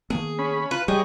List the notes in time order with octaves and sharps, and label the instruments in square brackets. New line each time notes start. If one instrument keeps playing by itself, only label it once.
[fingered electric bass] D#3 A#3 B3 [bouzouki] G#4
[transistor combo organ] C#4 B5
[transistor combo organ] F4 [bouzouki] B4
[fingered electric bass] G3 [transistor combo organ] G4 C#5 D#5 [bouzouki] G#4